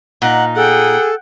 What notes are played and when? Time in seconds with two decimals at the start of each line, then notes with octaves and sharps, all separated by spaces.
0.22 A#2 D#4 F#5
0.56 G#4 A4 F#5 G5